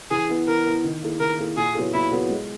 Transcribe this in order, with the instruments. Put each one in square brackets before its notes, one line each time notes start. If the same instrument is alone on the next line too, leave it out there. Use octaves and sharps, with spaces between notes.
[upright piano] E3 [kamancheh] G#4
[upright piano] B3 E4
[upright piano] E3 [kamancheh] A#4
[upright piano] B3 E4
D#3
A#3 E4 G#4
[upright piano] D#3 [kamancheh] A#4
[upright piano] A#3 E4 G#4
[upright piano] A#2 [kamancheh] G#4
[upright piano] F#3 B3 E4 G#4
[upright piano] A#2 [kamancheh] E4
[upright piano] F#3 B3 E4 G#4
G#3